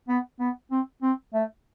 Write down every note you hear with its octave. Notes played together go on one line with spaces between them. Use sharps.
B3
B3
C4
C4
A3